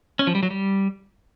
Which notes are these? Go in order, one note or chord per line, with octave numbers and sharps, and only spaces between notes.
C#4
F3
G3
F#3
G3